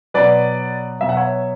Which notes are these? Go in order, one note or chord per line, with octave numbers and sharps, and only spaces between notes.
B2 F#3 B4 D5
B2 F#3 E5
F#5
C#5 E5